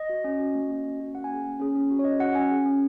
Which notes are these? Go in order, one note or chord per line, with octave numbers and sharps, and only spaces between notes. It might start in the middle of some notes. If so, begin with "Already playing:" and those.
Already playing: D#5
F#4
C#4
F#4
A#3
C#4 F#4
A#3
C#4 F#4
A#3 F#5
G#5
C#4 G#4
A#3
C#4 G#4
C#4
F#4
C#5
C#4 D#5
F#4 F#5
C#4 G#5
G#4
C#4